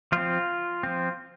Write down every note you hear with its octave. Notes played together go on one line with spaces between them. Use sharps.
F3 C4 F4
F3 C4